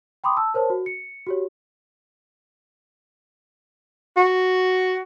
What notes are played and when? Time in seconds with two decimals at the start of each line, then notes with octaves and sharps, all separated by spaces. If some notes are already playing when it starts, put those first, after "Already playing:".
0.24 G5 B5 C6 D6 D#6
0.37 A5 E6
0.54 A#4 C5 C#5 A5
0.70 F#4
0.86 C#7
1.27 F#4 G4 C#5
4.17 F#4